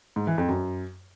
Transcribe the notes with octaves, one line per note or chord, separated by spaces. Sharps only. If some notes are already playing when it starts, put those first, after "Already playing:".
G#2
E3
F2
F#2